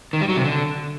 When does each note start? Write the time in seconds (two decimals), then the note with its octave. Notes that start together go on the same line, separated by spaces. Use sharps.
0.13 D#3
0.21 G3
0.29 F#3
0.37 C3
0.44 D3